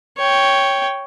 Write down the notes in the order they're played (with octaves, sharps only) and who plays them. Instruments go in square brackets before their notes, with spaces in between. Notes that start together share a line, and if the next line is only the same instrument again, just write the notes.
[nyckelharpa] C#5 G5